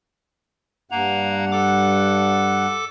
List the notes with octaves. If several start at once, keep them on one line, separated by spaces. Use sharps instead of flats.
G2 A#3 F#5 A#5
A4 D6